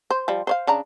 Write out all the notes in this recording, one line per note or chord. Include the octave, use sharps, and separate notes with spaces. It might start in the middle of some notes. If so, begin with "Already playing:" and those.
C5
F3 G3
C5 C#5 F5
C#3 D4 A#5